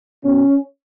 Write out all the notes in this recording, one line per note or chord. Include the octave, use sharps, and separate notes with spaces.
B2 F#3 C#4